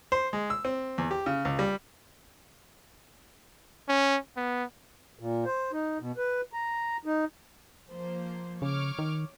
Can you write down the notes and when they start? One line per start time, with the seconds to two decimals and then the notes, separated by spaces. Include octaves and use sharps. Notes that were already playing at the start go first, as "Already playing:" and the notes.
0.12 C5
0.33 G#3
0.50 E6
0.65 C4
0.98 E2
1.11 G4
1.26 C#3
1.45 C#2
1.59 G3
3.88 C#4
4.36 B3
5.19 A#2
5.46 C5
5.73 D#4
6.00 B2
6.17 B4
6.53 A#5
7.05 D#4
7.90 F3 A#3 C5
8.62 C#3 C#5 D6 F6
8.99 D#3